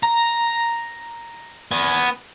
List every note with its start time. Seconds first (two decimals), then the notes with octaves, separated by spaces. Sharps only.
0.03 A#5
1.71 B3 G#5